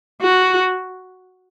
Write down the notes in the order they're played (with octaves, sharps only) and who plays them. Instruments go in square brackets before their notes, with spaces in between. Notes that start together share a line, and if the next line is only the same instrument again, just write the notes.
[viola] F#4